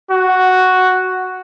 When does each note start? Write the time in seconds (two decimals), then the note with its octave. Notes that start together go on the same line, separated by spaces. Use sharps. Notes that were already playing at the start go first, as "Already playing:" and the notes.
0.11 F#4